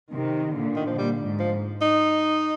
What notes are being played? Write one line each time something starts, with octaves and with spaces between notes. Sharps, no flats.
C3 D#3
A#2 D3
D#3
F3
A#2 G3
G#2
F3
D#4